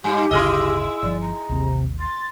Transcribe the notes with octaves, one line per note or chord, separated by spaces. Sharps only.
G2 D#4 G4
D1 G1 C#3 E4 G#4 D#5 E6
G1 F3 D5
A#5
A1 D#2 C3
C6 A6